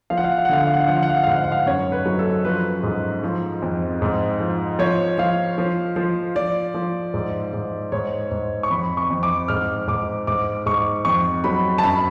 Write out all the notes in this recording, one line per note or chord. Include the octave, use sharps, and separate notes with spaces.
F3 F5
F#5
F5
F#5
F5
F#5
D3 F5
F#5
F5
F#5
F5
F3 F#5
F5
F#5
F5
F#5
F5
G#2 F#5
F5
F#5
F5
F#2 C#5
B4
F#3
A4
F3 B4
G#2
F3
F2
G#2
F3
F3 C#5
F3 F5
F3
F3
F3 D5
F3
G#2
G#2
G#2 C#5
G#2
C#6
F2 B5
C#6
F2
D6
G#2 F6
G#2 D6
G#2 D6
G#2 C#6
F2 C#6
F#3 B5
A5
F#2 B5